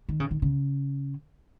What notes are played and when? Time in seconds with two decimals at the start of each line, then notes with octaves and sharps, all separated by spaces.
0.09 D#3
0.20 C#3
0.31 D#3
0.42 C#3